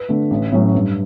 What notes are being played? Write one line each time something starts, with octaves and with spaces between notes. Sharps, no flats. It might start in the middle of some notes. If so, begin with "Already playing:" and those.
Already playing: B4
D3 A3
A1
A2 F#3 C#4
G2